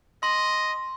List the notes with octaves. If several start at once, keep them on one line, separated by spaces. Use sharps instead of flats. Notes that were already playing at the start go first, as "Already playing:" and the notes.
D#5 C6